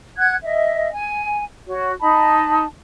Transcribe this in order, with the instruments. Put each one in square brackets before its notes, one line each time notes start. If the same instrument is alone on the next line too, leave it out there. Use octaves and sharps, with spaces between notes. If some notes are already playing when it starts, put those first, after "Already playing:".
[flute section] F#5 F#6 G#6
D#5 E5
G#5
F#4 C#5
D#4 A5 B5